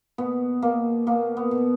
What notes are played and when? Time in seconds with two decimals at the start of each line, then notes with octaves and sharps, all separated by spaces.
0.18 B2 B3
0.62 B2 A#3
1.07 B2 A#3
1.37 B3
1.51 B2